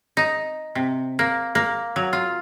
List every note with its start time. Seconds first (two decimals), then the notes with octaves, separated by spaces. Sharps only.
0.17 D#4
0.75 C3
1.19 A#3
1.55 A#3
1.96 F#3
2.13 F4